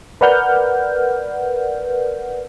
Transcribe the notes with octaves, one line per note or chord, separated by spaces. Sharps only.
A#4 B4 D5 F#5 F6 G6